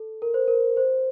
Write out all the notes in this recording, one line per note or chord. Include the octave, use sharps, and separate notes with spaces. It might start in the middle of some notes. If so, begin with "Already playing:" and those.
Already playing: A4
A#4
C5
A#4
C5